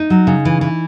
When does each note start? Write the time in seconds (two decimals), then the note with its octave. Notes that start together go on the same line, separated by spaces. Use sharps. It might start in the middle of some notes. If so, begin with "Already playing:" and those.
Already playing: D#4
0.10 F#3
0.27 C#3
0.45 E3
0.61 E3